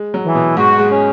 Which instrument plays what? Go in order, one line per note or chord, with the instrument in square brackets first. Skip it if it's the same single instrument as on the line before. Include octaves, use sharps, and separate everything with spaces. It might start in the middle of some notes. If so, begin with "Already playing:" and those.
Already playing: [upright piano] G#3
F#3
[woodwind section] E3
[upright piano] B2
[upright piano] G#2 [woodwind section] F#4
[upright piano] G#3
[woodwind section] C#4